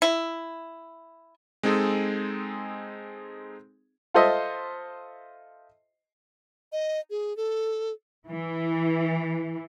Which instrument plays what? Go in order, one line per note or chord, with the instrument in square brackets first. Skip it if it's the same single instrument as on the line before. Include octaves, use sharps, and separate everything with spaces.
[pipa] E4
[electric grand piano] G#3 C4 D#4 G#4 A4
[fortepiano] F4 A4 C5 D#5 E5
[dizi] D#5
G#4
A4
[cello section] E3